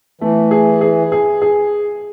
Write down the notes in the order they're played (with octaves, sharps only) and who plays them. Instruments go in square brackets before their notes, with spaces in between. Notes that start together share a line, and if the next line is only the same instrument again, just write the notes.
[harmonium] E3 [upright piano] A3
[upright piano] G#4
G#4
G#4
G#4